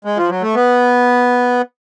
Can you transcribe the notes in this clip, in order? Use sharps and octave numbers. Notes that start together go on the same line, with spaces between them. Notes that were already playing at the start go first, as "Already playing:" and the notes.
G#3
F3
F#3
A3
B3